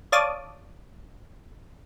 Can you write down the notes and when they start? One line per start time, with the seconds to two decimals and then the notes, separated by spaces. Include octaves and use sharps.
0.12 C#5 D5 F5 A5 D6 D#6